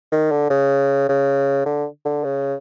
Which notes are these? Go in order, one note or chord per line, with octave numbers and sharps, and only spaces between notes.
D#3
D3
C#3
C#3
D3
D3
C#3